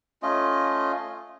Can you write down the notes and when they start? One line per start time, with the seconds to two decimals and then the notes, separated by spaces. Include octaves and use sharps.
0.22 A3 C#4 F4 D#5